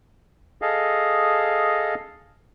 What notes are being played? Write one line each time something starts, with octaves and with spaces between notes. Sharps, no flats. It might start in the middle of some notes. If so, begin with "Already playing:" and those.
G#4 A4 D#5 F5